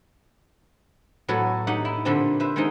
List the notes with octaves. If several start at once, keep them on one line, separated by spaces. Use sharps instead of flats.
A2 F#3 B3 F#4 A4
D#4 G4 F#5
E4
A#2 D3 G3 C4 D4
B4 C5 E5
D#3 G#3 B3 C4 D#4